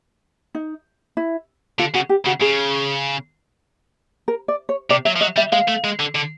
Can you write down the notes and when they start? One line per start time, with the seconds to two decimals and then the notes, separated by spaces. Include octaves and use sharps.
0.55 D#4
1.17 E4
1.79 D3 F4
1.94 C#3 F#4
2.09 G4
2.26 C#3 F#4
2.41 C#3 G#4
4.28 A#4
4.48 D5
4.69 C#5
4.90 C3 D5
5.05 F#3 E5
5.16 F3
5.21 F#3 D#5
5.36 G3 E5
5.52 G#3 F5
5.68 A3
5.84 G#3
5.99 D3
6.15 D3